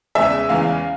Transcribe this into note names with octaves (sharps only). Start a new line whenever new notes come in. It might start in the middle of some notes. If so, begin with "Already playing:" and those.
E2 C#3 E3 G#3 E5
E2 C#3 E3 G#3 F5